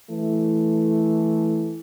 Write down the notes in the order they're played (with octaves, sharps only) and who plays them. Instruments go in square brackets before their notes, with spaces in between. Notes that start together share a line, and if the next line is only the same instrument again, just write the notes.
[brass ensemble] E3 A3